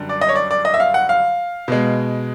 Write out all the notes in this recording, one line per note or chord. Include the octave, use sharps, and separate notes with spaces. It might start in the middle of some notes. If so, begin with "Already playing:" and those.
Already playing: F#2 D3 G3
D5
D#5
C#5
D5
D5
D#5
E5
F5
F#5
F5
B2 G#3